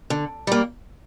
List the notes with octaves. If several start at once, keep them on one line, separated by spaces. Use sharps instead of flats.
D3
G3 A#3